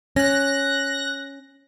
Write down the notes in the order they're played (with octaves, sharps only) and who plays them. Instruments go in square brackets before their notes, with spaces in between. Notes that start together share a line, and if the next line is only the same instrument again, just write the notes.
[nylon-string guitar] C#4 [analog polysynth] F#6 A#6